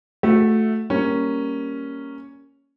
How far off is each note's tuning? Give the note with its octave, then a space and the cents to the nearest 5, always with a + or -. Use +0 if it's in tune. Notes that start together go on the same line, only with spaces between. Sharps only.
A3 -5 F#4 -20
G3 +0 A#3 +0 C#4 +0